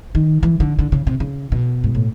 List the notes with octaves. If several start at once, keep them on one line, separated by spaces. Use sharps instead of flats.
D#3
E3
D3
D3
C#3
C3
C#3
B2
G#2
A2